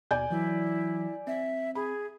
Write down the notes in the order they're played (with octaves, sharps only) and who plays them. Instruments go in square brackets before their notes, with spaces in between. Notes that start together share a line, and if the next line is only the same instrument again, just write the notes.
[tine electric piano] D#2 B2 [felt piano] D5 G#5 G6
[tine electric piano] E3 F#3 [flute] E4
[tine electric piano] C4 [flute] E5
[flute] G#4 [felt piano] B5